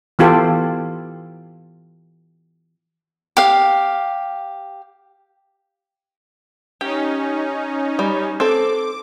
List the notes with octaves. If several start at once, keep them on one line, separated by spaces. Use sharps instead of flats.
E3 B3 F4 G4 A4
G4 F5
C#4 D#4 G4
G3
C4 A4 D6